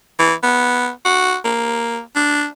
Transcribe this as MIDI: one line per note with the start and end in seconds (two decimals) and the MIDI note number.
0.19 0.34 52
0.43 0.89 59
1.05 1.37 66
1.45 2.00 58
2.16 2.47 62